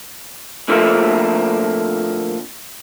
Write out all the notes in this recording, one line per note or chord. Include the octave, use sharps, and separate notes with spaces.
A#2 D3 F3 A3 A#3 C4